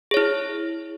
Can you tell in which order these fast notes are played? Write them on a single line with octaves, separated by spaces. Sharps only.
G#4 C#5 E4